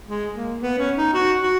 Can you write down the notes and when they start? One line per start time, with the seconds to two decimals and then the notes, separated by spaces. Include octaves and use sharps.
0.07 G#3
0.35 A#3
0.61 B3
0.78 C#4
0.97 D#4
1.14 F#4
1.41 F#4